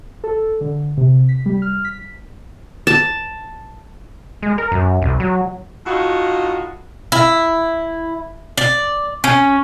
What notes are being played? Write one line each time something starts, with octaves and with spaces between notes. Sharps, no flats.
A4
D3
C3
B6
G3
F6
B6
A5
G#3
A#4
F#2
C2
F#3
A2 D#4 F4 F#4
E4
D5
C#4